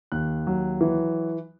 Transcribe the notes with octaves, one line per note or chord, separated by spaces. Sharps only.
D#2 F#6
F#3
E3